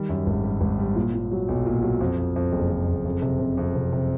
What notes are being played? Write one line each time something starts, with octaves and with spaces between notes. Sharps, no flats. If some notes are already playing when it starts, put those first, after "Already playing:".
Already playing: D#3 G3
F#2
G#1
G3
G#1
G3
A#2
A#2
F#3
B1
A#2
F#3
F2
F2
F2
F#1
F2
F#1
F2
C3
C3
F2
C3
C3